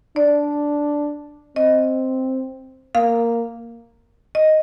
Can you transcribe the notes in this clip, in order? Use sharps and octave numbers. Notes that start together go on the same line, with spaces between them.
D4 D5
C4 D#5
A#3 F5
D#5